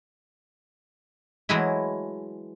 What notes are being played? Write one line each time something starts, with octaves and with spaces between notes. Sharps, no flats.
E3 F#3 G#3 A3 E4